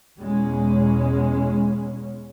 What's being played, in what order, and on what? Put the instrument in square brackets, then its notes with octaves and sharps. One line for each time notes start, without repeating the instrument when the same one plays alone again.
[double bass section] E2 B2 G#3 C#4